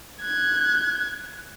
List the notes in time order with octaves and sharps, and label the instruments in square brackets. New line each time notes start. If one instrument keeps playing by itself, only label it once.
[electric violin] F#6 G#6